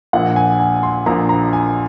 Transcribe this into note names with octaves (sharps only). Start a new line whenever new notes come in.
A#1 A#2 F3 F#5
G#5
G#5
C6
A#1 A#2 F3 A#5
A#5
G#5